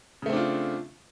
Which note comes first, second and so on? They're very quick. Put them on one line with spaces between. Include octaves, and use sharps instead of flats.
C#3 A3 C4 D4 F4